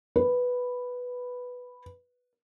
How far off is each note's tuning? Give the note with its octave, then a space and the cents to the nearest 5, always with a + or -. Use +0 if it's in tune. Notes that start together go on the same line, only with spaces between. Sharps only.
B4 +0